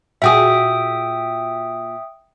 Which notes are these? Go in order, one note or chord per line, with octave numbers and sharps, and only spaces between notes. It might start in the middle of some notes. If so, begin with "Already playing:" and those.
A#2 F#4 G#4 E5 G5 D#6